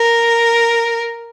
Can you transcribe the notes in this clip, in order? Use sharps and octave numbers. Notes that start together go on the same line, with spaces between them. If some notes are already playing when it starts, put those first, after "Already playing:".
Already playing: A#4